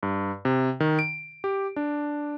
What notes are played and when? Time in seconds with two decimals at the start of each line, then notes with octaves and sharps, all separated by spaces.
0.03 G2
0.45 C3
0.80 D#3
0.99 D7
1.44 G4
1.76 D4